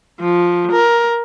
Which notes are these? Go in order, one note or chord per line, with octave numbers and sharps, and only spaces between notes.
F3
A#4